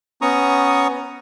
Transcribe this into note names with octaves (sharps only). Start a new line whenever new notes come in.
B3 C#4 A#5 C#6 D#6